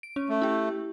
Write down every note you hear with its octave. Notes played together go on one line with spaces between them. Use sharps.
D7
C#4
A3
E4 G4